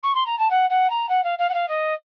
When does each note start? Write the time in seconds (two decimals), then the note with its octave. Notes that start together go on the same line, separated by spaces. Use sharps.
0.03 C#6
0.14 C6
0.26 A#5
0.38 A5
0.50 F#5
0.69 F#5
0.90 A#5
1.09 F#5
1.23 F5
1.38 F5
1.49 F#5
1.53 F5
1.68 D#5